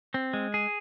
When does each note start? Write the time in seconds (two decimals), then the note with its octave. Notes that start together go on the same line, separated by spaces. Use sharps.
0.14 C4
0.33 G#3
0.54 G#4